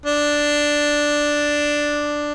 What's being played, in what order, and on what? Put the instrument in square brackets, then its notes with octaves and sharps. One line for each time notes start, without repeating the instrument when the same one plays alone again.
[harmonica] D4